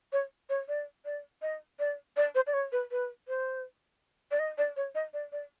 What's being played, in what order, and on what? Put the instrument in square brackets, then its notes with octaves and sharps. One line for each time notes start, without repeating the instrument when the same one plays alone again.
[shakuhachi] C#5
C#5
D5
D5
D#5
D5
D5
C5
D5
C#5
B4
B4
C5
D5
D#5
D5
C#5
D#5
D5
D5